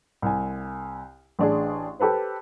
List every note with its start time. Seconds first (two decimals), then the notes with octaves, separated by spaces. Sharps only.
0.22 C2 G#5
1.39 A1 D4 G#4
2.00 G4 A4 B4 C5